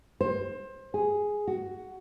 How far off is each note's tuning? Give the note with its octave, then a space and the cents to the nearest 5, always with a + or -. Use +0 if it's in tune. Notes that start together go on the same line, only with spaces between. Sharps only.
C5 +25
G#4 +0
F#4 +10